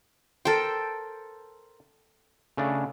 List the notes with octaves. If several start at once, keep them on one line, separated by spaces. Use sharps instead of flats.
A4 A#4 C5 G5
C#3 A3 D4